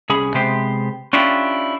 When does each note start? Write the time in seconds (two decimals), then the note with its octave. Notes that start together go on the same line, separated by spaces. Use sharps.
0.10 C2 C#4 G#4 B5
0.34 C3 G#3 B3 G4 C5
1.13 C#4 D4 E4 F4 G4